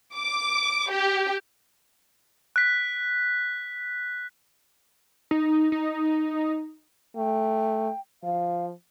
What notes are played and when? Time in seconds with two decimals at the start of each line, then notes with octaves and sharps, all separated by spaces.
0.15 D6
0.90 G4
2.56 F#6 B6
5.31 D#4
5.72 D#4
7.16 A3 G5
8.23 F3 F5